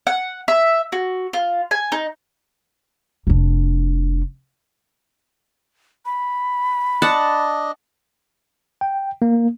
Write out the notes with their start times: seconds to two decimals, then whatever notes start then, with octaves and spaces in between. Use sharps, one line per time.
0.07 F#5
0.48 E5
0.92 F#4
1.33 F4
1.71 G#5
1.92 D#4
3.27 F1 D4
6.06 B5
7.02 D4 D#5 F#5 A5
8.81 G5
9.22 A#3